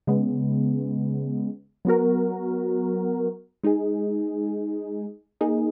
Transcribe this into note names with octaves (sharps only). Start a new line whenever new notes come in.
C#3 G#3 B3
F#3 B3 F#4 A#4
G#3 D#4 G#4
A#3 D#4 G#4